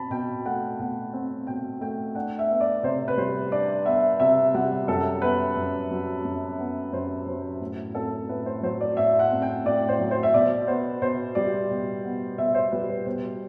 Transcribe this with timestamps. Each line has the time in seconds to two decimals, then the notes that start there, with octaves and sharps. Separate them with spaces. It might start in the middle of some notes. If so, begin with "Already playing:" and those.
Already playing: B2 C4 A5 B5
0.10 B2 G5
0.46 A3 F#5
0.79 B2 F#5
1.13 C4
1.47 B2 G5
1.81 A3 G5
2.15 D4 F#5
2.39 E5
2.50 B3
2.61 D5
2.83 C3 C5
3.08 B4
3.17 G3 C5
3.52 D4 D5
3.86 B3 E5
4.20 C3 E5
4.54 G3 F#5
4.88 F#2 A4
5.22 B3 B4
5.56 F#2
5.91 F#3
6.25 F#2
6.58 B3
6.93 F#2 C5
7.26 F#3 C5
7.61 A2
7.94 C4 A4
8.29 A2 B4
8.46 C5
8.63 F#3 C5
8.81 D5
8.97 A2 E5
9.19 F#5
9.31 C4
9.42 G5
9.65 A2 D5
9.88 C5
9.99 F#3
10.11 C5
10.23 E5
10.33 B2 D5
10.67 B3 C5
11.02 B2 C5
11.35 G3 D5
11.70 B2
12.04 B3
12.38 B2 E5
12.54 C5
12.71 G3 B4
12.89 B4
13.06 B2 C5